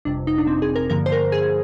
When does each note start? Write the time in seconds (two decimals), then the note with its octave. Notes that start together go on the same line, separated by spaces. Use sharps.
0.05 G1 F2 C3 D4
0.27 D#4
0.38 D4
0.47 C4
0.62 G#4
0.76 A#4
0.90 G2 D3 F3 A#3 A#4
1.06 C5
1.12 A#4
1.32 G#4